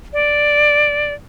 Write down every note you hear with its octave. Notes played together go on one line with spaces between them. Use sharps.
D5